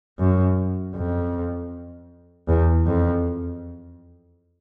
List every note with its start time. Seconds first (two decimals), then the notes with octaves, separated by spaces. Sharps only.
0.19 F#2
0.95 F2
2.48 E2
2.86 F2